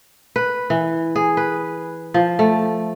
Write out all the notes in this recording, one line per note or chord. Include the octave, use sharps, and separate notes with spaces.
B4
E3
G#4
B4
F3
A3